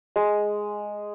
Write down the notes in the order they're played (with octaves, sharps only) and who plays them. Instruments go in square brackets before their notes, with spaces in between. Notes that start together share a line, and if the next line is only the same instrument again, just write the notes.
[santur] G#3